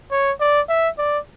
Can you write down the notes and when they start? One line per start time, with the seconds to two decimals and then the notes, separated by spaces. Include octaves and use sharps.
0.11 C#5
0.40 D5
0.69 E5
0.98 D5